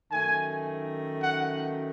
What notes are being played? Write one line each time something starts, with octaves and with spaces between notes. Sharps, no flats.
F#2 D#3 A3 G#5
F#5